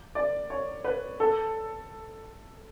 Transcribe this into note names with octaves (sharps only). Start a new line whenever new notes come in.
D5
C#5
B4
A4